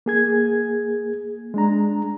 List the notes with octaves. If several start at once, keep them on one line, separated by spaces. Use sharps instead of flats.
A#3 G#4 G#6
G#3 D4 A#5